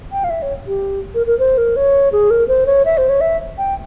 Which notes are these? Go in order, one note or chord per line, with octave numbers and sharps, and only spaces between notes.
G5
F5
E5
C#5
G4
A#4
A#4
C5
A#4
C#5
G#4
A#4
C5
C#5
E5
C5
C#5
E5
G5